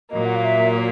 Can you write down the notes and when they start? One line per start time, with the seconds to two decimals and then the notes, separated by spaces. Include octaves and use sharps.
0.11 A#2 F#3 A#3 D#5
0.25 F#5
0.35 F5
0.45 E5